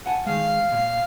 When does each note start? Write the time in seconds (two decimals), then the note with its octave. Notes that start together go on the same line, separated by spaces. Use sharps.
0.06 F#5 G#5 A5
0.26 D#3 G#3 F5
0.72 A#2